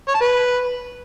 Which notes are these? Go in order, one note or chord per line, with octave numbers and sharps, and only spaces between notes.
C#5
A5
B4